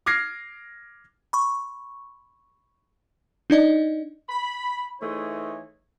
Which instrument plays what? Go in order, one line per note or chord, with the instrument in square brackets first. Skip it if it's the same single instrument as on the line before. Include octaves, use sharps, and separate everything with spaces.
[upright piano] D6 F6 G#6 A#6 C7
[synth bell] B5 C#6
D4 D#4 D5 D#5
[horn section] B5
E3 A3 D#4 G#4 C5 C#5